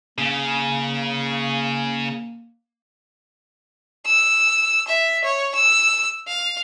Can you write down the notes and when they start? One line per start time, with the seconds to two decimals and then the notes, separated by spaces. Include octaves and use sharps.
0.18 C#3 A#3
4.06 E6
4.88 E5
5.24 C#5
5.55 E6
6.28 F5